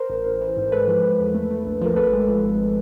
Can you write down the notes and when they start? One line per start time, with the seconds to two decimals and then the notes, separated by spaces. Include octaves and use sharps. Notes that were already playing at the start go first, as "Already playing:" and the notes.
Already playing: A#4 C5
0.10 A1
0.25 A1
0.41 E3
0.57 G#2
0.72 G#3 A4 B4
0.88 F3
1.04 F3
1.19 E2
1.34 A3
1.50 A3
1.65 A#1
1.81 F3 A#4
1.96 G#1 A4 B4
2.13 G#3
2.28 F3
2.44 G#1